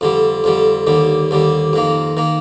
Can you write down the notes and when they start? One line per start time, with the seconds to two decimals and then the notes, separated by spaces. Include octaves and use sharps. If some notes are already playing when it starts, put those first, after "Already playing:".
0.01 F2 D3 G3
0.44 F2 D3 G3
0.87 D#2 D3 G3
1.31 D#2 D3 G3
1.73 F2 D#3 A#3
2.17 D#3 A#3